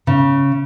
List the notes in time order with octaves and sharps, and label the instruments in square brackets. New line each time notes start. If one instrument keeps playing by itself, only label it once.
[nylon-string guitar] C#3